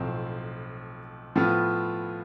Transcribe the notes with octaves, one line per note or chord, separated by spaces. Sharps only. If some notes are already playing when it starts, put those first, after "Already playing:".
Already playing: B1 A2 F3 C4
A2 F3 B3 F4